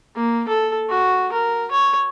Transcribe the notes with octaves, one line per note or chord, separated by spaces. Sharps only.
A#3
A4
F#4
A#4
C#5